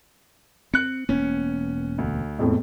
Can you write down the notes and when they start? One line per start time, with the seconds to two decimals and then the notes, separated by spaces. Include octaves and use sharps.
0.74 C4 F#6 C#7
1.09 E1 A#3 B3 C#4
1.98 D2
2.39 E1 F2 A2